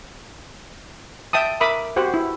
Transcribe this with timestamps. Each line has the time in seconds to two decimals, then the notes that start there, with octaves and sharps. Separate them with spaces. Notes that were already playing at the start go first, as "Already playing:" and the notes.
1.33 E5 G5 A5 D#6
1.61 A#4 E5 B5 D6 D#6
1.96 F#4 G4 C5 F#5
2.14 E4